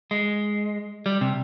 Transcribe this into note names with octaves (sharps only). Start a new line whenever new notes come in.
G#3
G3
C3